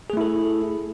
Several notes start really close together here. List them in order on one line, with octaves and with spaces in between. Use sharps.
G#4 A3 E4 A4